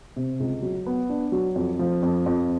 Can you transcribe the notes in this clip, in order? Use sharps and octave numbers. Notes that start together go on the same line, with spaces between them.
C3
C#2
F#3
B3
D4
F#3
F2
F3
F2
F2